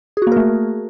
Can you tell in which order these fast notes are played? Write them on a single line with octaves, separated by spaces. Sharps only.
G#4 F#4 A#3 A#4 A3